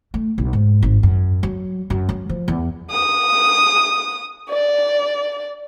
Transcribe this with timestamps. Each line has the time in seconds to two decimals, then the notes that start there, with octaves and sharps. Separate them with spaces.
0.14 A3
0.38 B1
0.53 G#2
0.82 G#1
1.03 F#2
1.43 F#3
1.90 F#2
2.09 F#3
2.29 F3
2.48 E2
2.91 D#6
4.49 D5